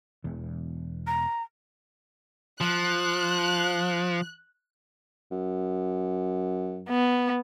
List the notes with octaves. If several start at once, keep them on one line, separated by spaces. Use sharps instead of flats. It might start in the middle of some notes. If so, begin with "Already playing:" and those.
E1 E2
A#5
F3 F#6
F#2
B3